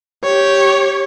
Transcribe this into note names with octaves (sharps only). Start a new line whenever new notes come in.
G4 C#5